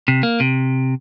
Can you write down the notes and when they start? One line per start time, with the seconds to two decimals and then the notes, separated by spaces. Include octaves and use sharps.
0.08 C3
0.23 A#3
0.40 C3